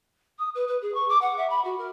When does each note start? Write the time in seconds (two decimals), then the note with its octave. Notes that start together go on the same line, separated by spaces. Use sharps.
0.39 D#6
0.55 B4
0.68 B4
0.82 G#4
0.94 C#6
1.09 D6
1.22 F#5
1.38 E5
1.50 B5
1.65 F#4
1.78 A#4